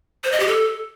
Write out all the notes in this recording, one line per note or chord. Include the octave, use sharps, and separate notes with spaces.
C5
D#5
G4
A4